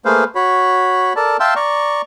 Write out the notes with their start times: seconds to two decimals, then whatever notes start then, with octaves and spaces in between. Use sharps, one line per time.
0.05 A3 A#3 G#4 B4 C5 F5
0.35 F#4 C#5 B5
1.16 A4 A#4 D5 A5
1.40 E5 F5 G5 A5 C6 E6
1.56 D5 A#5 C#6